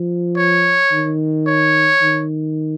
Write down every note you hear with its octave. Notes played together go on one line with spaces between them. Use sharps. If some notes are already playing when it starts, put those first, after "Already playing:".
Already playing: F3
C#5
D#3
C#5
D#3